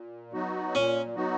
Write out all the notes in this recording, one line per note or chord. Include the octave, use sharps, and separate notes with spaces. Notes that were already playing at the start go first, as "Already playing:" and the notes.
Already playing: A#2
F#3 B3 D#4 F#4
A#2 C#4
F#3 B3 D#4 F#4